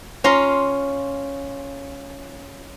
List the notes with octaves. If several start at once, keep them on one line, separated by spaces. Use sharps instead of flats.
C#4 F4 A#5 C6